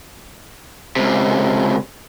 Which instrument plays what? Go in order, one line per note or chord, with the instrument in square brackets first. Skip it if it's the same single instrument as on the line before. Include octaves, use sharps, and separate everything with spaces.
[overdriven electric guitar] C#2 C3